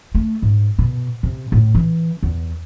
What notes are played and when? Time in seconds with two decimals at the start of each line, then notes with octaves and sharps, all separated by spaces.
0.15 A3
0.42 G#2
0.79 B2
1.23 C3
1.52 A2
1.74 E3
2.23 E2